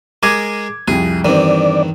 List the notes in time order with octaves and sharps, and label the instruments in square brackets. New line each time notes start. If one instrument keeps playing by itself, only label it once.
[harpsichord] G#3 G#4 A#4 [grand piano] D6 G#6
[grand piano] C2 F2 [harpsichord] G#4
[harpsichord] E2 D#3 [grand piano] G2 C4 [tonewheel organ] D5